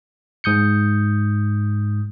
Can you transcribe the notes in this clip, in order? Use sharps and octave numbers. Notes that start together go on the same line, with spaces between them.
G#2 D#6 G6 C#7